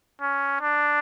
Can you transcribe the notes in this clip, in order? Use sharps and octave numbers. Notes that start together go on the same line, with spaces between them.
C#4
D4